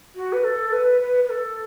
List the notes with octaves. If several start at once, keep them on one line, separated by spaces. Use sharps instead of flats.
F#4
B4
A4
B4
B4
B4
A4